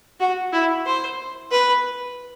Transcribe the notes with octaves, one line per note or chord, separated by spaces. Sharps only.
F#4
E4
C5
B4